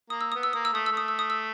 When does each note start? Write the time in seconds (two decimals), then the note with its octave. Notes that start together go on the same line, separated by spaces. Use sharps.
0.10 A#3 D#6
0.21 E6
0.32 B3 D#6
0.43 E6
0.53 A#3 D#6
0.65 E6
0.73 A3 D#6
0.86 E6
0.92 A3
0.97 D#6
1.08 E6
1.19 D#6
1.30 E6